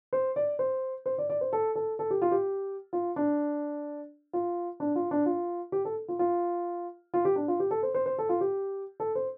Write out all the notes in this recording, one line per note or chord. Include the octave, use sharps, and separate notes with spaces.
C5
D5
C5
C5
D5
D5
C5
A4
A4
A4
G4
F4
G4
F4
D4
F4
D4
F4
D4
F4
G4
A4
F4
F4
F4
G4
D4
F4
G4
A4
C5
C5
C5
A4
F4
G4
A4
C5